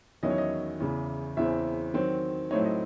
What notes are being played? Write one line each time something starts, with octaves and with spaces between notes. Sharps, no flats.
E2 D#3 F#3 C#4 E4 D#5
C#5
D#5
E2 C#3 E3
E2 C#3 E3 C4 E5
D#3 F#3 C4
A2 F#3 A3 C4 D#4 C#5
D#5